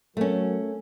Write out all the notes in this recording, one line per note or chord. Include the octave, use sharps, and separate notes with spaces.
F#3 A3 C#4 A#4